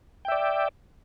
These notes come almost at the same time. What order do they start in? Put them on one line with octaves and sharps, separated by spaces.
G5 E5 D5